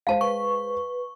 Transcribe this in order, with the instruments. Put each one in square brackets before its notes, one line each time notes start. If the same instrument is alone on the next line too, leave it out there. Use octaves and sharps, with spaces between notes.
[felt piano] G#3 C5 [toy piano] F5 A5
[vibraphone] B4 [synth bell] C#6